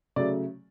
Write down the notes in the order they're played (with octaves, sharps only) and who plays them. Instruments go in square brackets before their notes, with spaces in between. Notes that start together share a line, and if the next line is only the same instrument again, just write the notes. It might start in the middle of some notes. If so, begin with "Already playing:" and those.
[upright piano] C#3 F#3 A3 D5